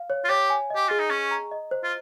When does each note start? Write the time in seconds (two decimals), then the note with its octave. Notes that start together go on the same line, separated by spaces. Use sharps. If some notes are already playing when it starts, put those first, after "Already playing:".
Already playing: F5
0.10 C#5
0.24 F4
0.29 G4 C#5
0.50 G#5
0.70 D#5
0.75 G4
0.88 F4 G#4
0.99 D#4
1.10 C#4 C#6
1.31 A#5
1.51 D#5
1.71 C5
1.84 F4